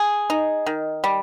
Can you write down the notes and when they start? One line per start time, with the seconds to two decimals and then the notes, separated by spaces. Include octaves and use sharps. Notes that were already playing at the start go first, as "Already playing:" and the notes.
Already playing: G#4
0.30 D#4
0.66 D#3
1.04 G3